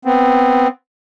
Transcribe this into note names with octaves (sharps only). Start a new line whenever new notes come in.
B3 C4